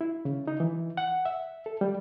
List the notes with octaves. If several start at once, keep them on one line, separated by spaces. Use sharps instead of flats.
E4
C#3
D#4
E3
F#5
E5
A4
G3